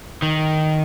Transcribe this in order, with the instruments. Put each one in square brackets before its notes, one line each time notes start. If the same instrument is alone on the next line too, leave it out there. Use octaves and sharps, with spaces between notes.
[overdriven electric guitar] D#3